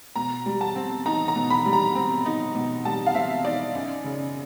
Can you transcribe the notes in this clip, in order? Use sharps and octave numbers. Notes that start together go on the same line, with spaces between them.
B2 A#5
G3
A5
C4
D#4 A#5
A#5
B2
B5
G3
A#5
C4
D#4
B2
G3 A5
F5
C4 E5
D#4 D5
F#2
C#3